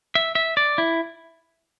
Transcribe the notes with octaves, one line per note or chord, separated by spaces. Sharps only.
E5
E5
D5
E4